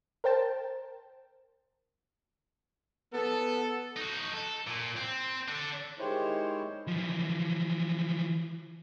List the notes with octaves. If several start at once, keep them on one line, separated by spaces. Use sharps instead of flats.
A#4 C5 G5 A5
B3 A4
D#4 F#4
A4
A#2
C4
D4 A4
D#3 G3 G#3 E4 C5 C#5
E3 F3